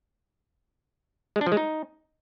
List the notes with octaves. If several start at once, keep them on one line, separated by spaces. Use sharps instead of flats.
G#3
D4
F3
G#3
D#4